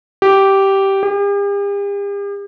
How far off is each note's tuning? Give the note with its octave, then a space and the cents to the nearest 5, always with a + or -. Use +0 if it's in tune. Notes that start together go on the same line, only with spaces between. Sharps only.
G4 -10
G4 +45